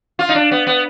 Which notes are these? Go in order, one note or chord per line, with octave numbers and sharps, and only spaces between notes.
F4
D#4
D4
B3
B3